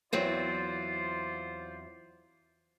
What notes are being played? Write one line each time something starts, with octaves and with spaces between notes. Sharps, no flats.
E2 F#3 C4 F4 C5 D5